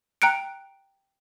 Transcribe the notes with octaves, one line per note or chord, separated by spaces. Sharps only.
G5 A#5 F#6 C#7 D7